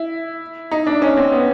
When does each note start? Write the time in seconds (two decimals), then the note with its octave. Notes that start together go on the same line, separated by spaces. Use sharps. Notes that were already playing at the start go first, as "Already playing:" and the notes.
Already playing: E4
0.71 D#4
0.87 D4
1.02 C#4
1.17 C4
1.32 B3